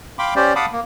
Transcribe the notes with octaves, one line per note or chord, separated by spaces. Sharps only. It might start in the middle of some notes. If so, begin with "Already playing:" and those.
F5 G5 B5 C6 D6
C#4 G4 C5 D5
F5 F#5 A5 B5 D6 D#6
A#3